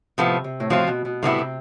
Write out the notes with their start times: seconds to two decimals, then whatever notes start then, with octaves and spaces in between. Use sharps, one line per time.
0.18 A2 C3 F3 B3
0.44 C3
0.60 A2
0.70 B2 F3 C4 F4
0.87 B2
1.05 B2
1.23 A2 C3 G3 B3 E4
1.38 C3